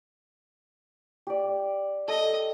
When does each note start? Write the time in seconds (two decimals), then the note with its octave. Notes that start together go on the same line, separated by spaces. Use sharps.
1.27 G4 D5
2.08 A4 D#5